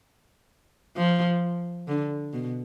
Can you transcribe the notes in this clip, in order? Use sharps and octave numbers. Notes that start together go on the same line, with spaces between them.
F3
D3
B2